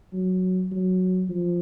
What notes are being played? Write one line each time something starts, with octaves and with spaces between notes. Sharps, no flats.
F#3
F#3
F3